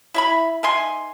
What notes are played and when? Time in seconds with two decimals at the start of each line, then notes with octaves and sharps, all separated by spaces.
0.14 E4 E5 B5
0.63 D#3 E5 G#5 C6